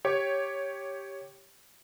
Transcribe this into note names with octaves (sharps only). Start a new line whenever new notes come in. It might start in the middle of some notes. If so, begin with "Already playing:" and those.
G4 C#5